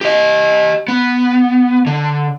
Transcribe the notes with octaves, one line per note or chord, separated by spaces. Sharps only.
G4 D#5
B3
D3